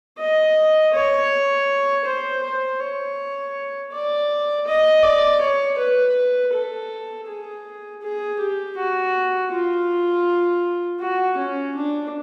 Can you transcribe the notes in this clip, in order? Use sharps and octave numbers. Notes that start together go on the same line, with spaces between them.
D#5
C#5
C5
C5
C#5
D5
D#5
D5
C#5
B4
A4
G#4
G#4
G4
F#4
F4
F#4
C#4
D4